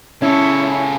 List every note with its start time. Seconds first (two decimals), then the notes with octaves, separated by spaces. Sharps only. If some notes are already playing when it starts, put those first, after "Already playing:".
0.22 C#3 C#4 E4 A4 C#5